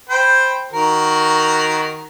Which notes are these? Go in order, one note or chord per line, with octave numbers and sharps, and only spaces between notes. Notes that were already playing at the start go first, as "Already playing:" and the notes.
C5 G5 B5
D#3 F#4 A#4